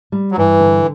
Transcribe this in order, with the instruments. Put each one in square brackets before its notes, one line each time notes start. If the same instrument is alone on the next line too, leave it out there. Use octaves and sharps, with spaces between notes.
[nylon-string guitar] G3
[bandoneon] F#3
[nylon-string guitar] G2 [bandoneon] E3
[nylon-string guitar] D3